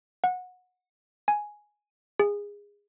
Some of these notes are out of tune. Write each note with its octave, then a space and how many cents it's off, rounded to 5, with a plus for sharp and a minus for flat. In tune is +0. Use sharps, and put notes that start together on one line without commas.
F#5 -20
G#5 +5
G#4 -20